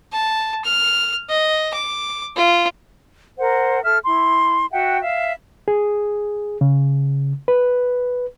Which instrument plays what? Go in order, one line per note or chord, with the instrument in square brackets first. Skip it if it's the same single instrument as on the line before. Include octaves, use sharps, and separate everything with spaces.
[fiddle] A5
F6
D#5
D6
F4
[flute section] A#4 C5 F#5
A4 E5 F6
E4 C6
F#4 E5 F#5 G5
E5 F5
[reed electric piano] G#4
C#3
B4